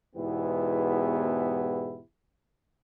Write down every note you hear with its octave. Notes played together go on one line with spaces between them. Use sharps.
E2 G#2 B2 B3 E4 G4